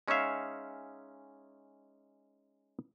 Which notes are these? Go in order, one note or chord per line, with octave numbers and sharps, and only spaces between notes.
G#3 C#4 D#4 C#5 E5 F5